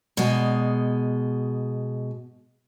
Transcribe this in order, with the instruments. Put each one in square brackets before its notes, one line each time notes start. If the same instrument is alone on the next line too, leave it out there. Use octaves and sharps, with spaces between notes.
[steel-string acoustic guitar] B2 G#3